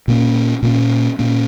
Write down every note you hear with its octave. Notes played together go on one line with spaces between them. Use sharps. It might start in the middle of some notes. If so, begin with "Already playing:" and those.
A#2 A#3 C#4
A#2 A#3 C#4
A#2 A#3 C#4